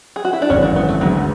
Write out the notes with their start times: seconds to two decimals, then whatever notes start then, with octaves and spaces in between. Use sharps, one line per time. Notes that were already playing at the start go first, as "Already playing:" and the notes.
0.16 G#4
0.25 F#4
0.33 E4
0.42 D4
0.50 G#1 F#2 C#3 E3 C#4
0.62 D4
0.76 B3
0.89 A3
1.01 D2 D3 F#3 G#3 B3